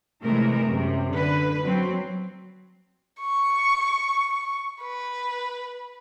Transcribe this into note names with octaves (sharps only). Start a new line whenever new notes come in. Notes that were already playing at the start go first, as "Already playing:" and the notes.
C3 E3 G#3 A3 A#4
F#2 C3
D3 B4
F#3 C4
C#6
B4